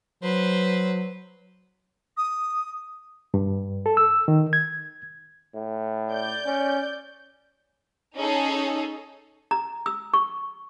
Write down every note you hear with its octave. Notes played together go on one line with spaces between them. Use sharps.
F#3 B4 C5
D#6
G2
A4
E6
D#3
G#6
A2
D5 G6
C#4
C#4 D#4 G#4 A4 C#5
A#5
E6
C#6